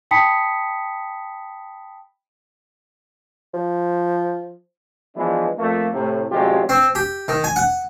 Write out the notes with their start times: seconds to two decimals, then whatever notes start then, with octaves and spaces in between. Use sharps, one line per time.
0.11 G5 A5 B5 D#6 B6 C#7
3.54 F3
5.16 E3 F3 G#3 B3 D4 E4
5.58 F2 A3 A#3
5.93 A2 C3
6.30 A1 C3 F#3 G#3 F4 G4
6.69 C4
6.95 G4
7.28 D#3
7.44 G#5
7.56 F#5